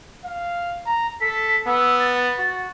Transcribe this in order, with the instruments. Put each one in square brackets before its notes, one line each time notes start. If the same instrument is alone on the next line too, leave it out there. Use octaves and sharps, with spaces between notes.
[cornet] F5
A#5
[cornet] A4 [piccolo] B6
[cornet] B3 [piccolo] E6
[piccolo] A6
[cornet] F#4